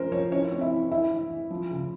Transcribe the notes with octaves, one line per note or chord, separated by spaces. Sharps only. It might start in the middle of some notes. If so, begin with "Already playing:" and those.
Already playing: F3 C#4 A#4 C5
F3 C#4 C#5
E3 C#4 C#5
C4 C#5
E4 E5
E3
E3 E4 E5
E3
E3
F3
C#3